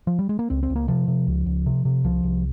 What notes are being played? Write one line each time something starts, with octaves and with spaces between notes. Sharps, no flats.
F3
G3
G#3
A#3
C#2 C4
C4
C#2
A#3
C3 F3
C3
C#2
C#2
C3
C3
C2 F3
C2